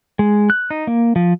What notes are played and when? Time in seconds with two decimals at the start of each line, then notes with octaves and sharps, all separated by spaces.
0.19 G#3
0.50 F#6
0.71 D#4
0.87 A#3
1.16 F3